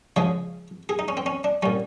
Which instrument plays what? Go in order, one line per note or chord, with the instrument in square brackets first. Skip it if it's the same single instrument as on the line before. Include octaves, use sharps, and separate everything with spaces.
[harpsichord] C#3 F3 G#3 G#4
G#4
D#4
C#4
C4
C#4
D4
A#2 G3 C#4